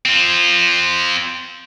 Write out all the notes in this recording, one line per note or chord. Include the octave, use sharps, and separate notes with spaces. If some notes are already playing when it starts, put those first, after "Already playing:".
C4 F4